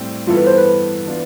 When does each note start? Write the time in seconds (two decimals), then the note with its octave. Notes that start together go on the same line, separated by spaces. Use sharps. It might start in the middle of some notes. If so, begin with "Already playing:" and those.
Already playing: A2 G3 C4
0.27 G2 E3 B3 E4 F4 A4
0.37 B4
0.47 C5
0.57 B4
1.06 E3 B3 D4 F4